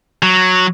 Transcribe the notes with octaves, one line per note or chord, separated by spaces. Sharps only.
F#3